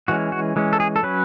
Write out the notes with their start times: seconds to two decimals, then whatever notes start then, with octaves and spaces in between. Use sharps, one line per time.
0.08 E3 G#3 C#4 F#4
0.32 F#4
0.56 E3 G#3 C#4
0.73 A4
0.80 G#4
0.96 A4
1.03 F#3 C#4 B4